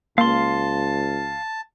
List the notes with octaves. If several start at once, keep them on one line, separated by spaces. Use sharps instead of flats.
C#2 A#3 F5 A5 C6